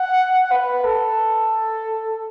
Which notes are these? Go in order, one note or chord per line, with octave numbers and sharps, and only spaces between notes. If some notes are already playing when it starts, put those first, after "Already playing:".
Already playing: F#5
B4
A4